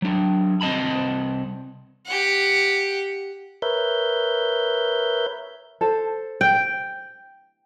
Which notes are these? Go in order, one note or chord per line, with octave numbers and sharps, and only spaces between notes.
F#3 D4
C2 C4 D#5 A5 B5
G4 F#5
A#4 B4 C#5 E5 G6
A4 C5
G5